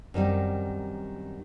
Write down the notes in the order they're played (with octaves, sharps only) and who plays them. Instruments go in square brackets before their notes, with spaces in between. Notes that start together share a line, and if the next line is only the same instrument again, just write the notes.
[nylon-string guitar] F#2 D#3 G3 C4